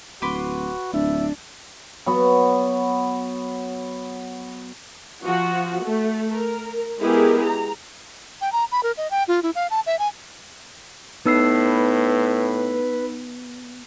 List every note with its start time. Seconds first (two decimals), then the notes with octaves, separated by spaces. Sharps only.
0.22 D1 F#4 B4 C6 D6
0.93 D1 D4 E5
2.06 F#3 B3
5.25 F3 F#4
5.85 A3
6.34 A#4
7.00 G#3 B3 E4 G4 G#4 A#4
7.44 A#5
8.41 G5
8.53 A#5
8.72 B5
8.83 A#4
8.97 D#5
9.11 G5
9.28 F4
9.43 E4
9.55 F5
9.70 A5
9.86 E5
9.99 G#5
11.26 A2 B3 D#4 B4 E6 C7